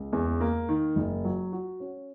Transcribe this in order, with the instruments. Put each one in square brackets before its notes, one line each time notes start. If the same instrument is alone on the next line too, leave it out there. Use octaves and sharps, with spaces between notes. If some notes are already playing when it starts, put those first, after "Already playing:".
Already playing: [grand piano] C#2
E2
A#3
D#3
F#1
F#3
F#4
C#4